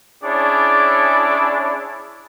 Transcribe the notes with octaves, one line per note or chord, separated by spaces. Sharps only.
C#4 D4 E4 G#4 C#5 D5